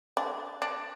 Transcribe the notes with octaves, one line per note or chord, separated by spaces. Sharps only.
D4
D4